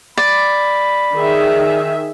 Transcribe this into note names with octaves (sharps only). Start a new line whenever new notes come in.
D5 B5
D#3 G#4 E5